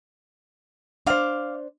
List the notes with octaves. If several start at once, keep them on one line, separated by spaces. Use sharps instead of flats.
D4 C5 F5 D6